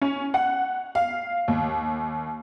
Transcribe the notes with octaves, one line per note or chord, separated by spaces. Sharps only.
C#4
F#5
F5
D#2